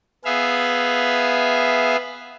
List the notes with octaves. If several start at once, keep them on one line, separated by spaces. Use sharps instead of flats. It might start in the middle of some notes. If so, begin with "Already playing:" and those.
B3 G#4 E5 F5